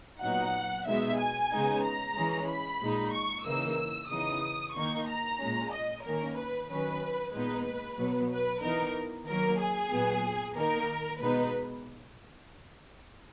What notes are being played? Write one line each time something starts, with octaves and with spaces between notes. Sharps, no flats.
A#2 F#3 B3 D#4 F#5
B2 G#3 B3 D#4 E5
G#5
C#3 G#3 B3 D#4
A#5
E3 G#3 C#4
B5
A#2 G#3 D#4
C#6
C#3 E3 A#3 D#4 E6
C#3 E3 B3 D#4 D#6
D#3 A#3 D#4 C#6
A#5
A#2 G#3 C#4
D#5
D#3 A#3 C#4 A#4
B4
D#3 F#3 C#4 B4
A#2 G#3 B3 D#4 B4
B2 F#3 B3
B4
E3 B3 D#4 A#4
D#3 F#3 A#3 A#4
G#4
A#2 F#3 B3
D#3 A#3 D#4 A#4
B2 G#3 B3 D#4 B4